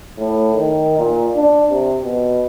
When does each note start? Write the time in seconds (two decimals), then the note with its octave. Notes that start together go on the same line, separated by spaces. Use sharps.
0.18 A2
0.54 D#3
0.99 A#2
1.36 D4
1.70 C3
2.03 B2